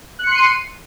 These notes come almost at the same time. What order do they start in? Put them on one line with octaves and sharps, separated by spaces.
F#6 C#7 C6 C7 D#7